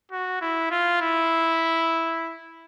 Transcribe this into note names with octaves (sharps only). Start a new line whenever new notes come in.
F#4
E4
F4
E4